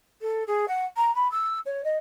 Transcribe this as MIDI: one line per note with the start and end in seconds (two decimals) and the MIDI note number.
0.21 0.44 69
0.47 0.65 68
0.68 0.86 78
0.96 1.14 82
1.15 1.30 83
1.31 1.59 88
1.66 1.82 73
1.84 1.98 75